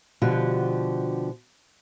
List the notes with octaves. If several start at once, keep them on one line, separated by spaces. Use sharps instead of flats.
B2 D3 F3 F#4 G4